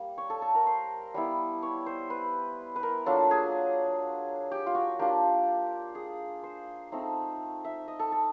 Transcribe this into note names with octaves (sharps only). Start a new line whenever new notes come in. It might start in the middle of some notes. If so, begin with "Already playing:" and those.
Already playing: G3 A#3
C#5
A4
A4
A#4
C5
G3 B3 E4
C#5
C5
B4
B4
A#4
F#3 A#3 D4 F4 A4
G#4
G4
F4
F#4
A#3 D4 F4 G4
G#4
C5
A3 C4 D#4
E5
D#5
A4
A4